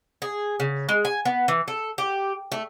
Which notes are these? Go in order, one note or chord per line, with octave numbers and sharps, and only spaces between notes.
G#4
C#3
G#3
G#5
B3
E3
A4
G4
A3